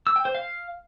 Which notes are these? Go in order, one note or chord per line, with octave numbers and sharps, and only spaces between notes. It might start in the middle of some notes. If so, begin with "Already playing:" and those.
E6
G5
C5
F5